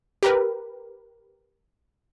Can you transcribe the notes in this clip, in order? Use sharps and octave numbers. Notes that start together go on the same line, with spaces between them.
G4 A#4 B4